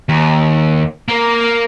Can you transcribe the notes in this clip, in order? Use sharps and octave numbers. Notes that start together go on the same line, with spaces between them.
D#2
A#3